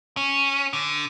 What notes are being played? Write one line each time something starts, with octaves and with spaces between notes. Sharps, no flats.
C#4
D3